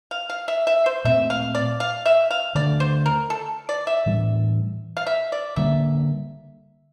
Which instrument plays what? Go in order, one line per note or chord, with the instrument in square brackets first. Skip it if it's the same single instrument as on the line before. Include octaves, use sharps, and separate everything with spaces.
[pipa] F5
F5
E5
E5
C5
[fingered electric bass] A#2 A3 C4 [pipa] E5
[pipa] F5
D5
F5
E5
F5
[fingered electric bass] D3 A3 D4 [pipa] D5
[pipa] C5
A#4
A4
D5
E5
[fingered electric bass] A2 E3 G3 D4
[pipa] F5
E5
D5
[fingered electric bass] D3 G3 A#3 [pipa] E5